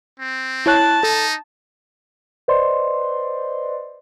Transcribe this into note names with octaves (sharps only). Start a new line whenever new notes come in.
C4
E4 C#5 A5 F#6
D#4 A4
B4 C5 D5 D#5 C6